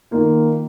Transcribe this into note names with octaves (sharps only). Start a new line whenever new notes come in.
D#3 A#3 F4